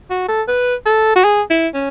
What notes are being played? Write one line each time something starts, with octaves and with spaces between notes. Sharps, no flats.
F#4
A4
B4
A4
F#4
G#4
E4
C#4